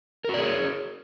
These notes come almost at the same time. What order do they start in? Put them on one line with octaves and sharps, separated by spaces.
A#4 F#4 D5 G#4 C#5